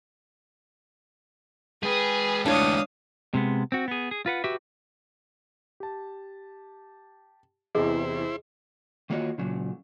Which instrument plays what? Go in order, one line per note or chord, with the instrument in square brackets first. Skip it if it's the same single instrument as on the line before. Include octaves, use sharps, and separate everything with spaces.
[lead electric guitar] G#3 G5 [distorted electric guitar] G#4 [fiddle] B4
[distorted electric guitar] D2 E3 [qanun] D4 C#5 [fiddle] F5 D#6
[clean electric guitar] C3 G#3 B3
C4 F#4
B3 G#4
G#4
F4 B4 F#5
F#4 G4 B4 E5
[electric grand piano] G4 A5
[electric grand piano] E2 C3 E3 [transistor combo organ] E4 C5 [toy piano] G#4 D#5
[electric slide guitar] D#3 A#3 F4 F#4 C#5 D#5
A#2 C#3 F#3